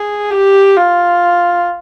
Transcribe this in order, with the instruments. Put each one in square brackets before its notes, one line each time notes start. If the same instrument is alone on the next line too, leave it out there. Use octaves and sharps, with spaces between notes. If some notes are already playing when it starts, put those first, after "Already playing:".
Already playing: [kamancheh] G#4
G4
F4